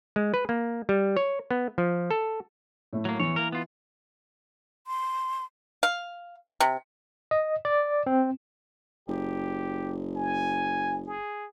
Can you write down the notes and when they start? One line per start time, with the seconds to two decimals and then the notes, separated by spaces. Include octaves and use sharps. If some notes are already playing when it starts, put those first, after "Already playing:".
0.16 G#3
0.34 B4
0.49 A#3
0.89 G3
1.17 C#5
1.51 B3
1.78 F3
2.11 A4
2.93 A2 A3
3.05 F#3 A#3
3.20 E2 G#2 E3 C#5
3.36 A#3 A#4
3.52 B3 F4
4.87 C6
5.83 F5
6.60 C3
7.31 D#5
7.65 D5
8.07 C4
9.09 F#1 G4
10.16 G#5
11.07 G#4